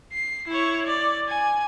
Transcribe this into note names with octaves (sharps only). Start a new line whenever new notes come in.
C7
E4 C#5
D5
G#5